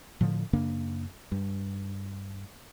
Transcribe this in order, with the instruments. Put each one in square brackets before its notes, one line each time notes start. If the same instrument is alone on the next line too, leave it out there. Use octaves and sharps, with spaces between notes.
[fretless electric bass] A2 D3 F3
F#2 C#3 A#3 D4
G2